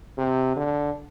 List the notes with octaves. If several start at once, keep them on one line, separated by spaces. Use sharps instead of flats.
C3
D3